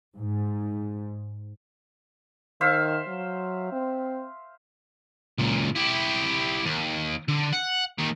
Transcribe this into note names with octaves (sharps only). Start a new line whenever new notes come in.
G#2
D#3 C5 E5 F5
F#3
C4
C#2 A#2
E4 G4
D#2
D3
F#5
D#2 D#3